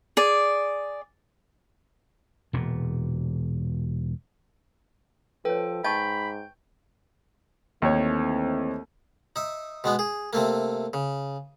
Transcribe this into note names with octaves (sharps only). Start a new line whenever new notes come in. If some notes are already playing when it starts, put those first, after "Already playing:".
G#4 D5
E1 A#2
F3 A4 B4 C#5 G5
G#2 D#5 G5 A5 B5 C#6 G6
D#2 E3 A3 C4 C#5
D#4 E5
B2 G#3 B3
G#4
C3 A3 A#3
C#3